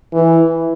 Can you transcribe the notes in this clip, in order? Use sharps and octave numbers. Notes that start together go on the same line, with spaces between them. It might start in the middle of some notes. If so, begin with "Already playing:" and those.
E3